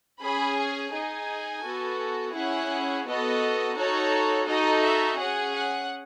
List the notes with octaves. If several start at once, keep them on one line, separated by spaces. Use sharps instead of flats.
C#4 G#4 B5
G#5
D#4 G#4 G#5
B3 F#4 A4
C#4 E4 G#4 F#5
B3 F#4 A4 D#5
D#4 F#4 A4 C#5
D#4 F#4 A4 D#5
E5
C#4 G#4 F#5
F#5